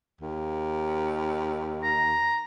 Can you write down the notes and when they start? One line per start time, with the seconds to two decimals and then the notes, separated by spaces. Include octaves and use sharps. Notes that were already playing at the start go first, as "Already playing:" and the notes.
0.21 D#2
1.84 A#5